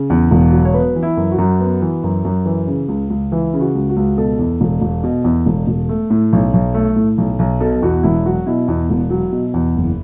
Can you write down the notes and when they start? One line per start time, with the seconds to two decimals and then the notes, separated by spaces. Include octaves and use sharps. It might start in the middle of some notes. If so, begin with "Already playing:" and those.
Already playing: C#3
0.10 E2
0.31 E1
0.52 F#3
0.65 C#5
0.74 B3 B4
0.95 E3
1.03 E4
1.17 F#2
1.32 F#4
1.38 F#2
1.60 B3
1.82 E3
2.04 F#2
2.25 F#2
2.46 E3
2.67 C#3
2.88 C#2
3.10 C#2
3.32 E3 E4
3.54 C#3
3.60 F#4
3.75 C#2
3.89 F#4
3.97 C#2
4.18 B2 A4
4.39 E2
4.61 E1
4.81 E1
5.04 B2
5.24 E2
5.46 E1
5.67 E1
5.89 A3
6.10 A2
6.33 B1
6.54 B1
6.74 A3
6.96 A2
7.18 B1
7.39 B1
7.61 B2 A4
7.82 E2 F#4
8.03 E1 E4
8.26 F#3 F#4
8.46 B2 E4
8.68 E2
8.90 E1
9.10 F#3
9.32 B2
9.54 E2
9.76 F#1